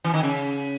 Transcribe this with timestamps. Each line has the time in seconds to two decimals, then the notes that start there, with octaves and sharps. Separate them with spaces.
0.04 E3
0.14 D#3
0.23 C#3